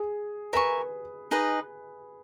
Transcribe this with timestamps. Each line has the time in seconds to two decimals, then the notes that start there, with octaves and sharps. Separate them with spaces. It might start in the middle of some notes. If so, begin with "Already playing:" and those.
Already playing: G#4
0.53 A#4 B4 E5 G#5 C#6
1.31 D#4 G#4 B4 D#5